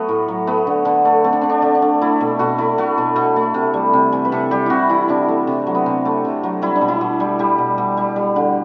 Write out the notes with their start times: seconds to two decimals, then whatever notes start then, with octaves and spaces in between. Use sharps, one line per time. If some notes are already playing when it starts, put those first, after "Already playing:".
Already playing: F#3 A3 B3
0.08 A2
0.28 F#3
0.47 A3 B3
0.67 D3
0.85 D3
1.05 A3
1.24 A3 C4
1.33 D4
1.41 D3 C4
1.49 D4
1.62 D3
1.75 D4
1.82 A3
2.01 A3 E4
2.21 B2
2.39 B2 F#4
2.58 A3 E4
2.78 A3 F#4
2.98 B2
3.16 B2
3.36 A3
3.54 C3
3.73 G3
3.93 C3
4.12 E3
4.25 B4
4.32 C3 A4
4.51 G3 G4
4.66 C3 E4 F#4
4.89 E3 E4
5.08 C3 D4
5.28 A3
5.47 C3
5.67 F#3
5.75 B3
5.86 C3 C4
6.05 A3
6.24 C3
6.43 F#3
6.62 G3 E4
6.75 D4
6.81 B2
6.88 E4
7.01 B2
7.20 G3
7.39 G3 G4
7.58 B2
7.78 B2
7.97 G3
8.16 G3
8.36 D3